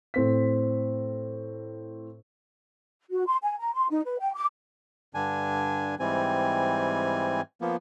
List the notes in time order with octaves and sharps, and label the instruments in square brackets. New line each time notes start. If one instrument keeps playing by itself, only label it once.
[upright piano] A2 C4 B6
[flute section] F#4
C6
G#5
A#5
C6
D#4
B4
G5
D6
[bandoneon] G2 D3 D4 G#5
G#2 E3 G3 C4 G#5
F3 A#3 B3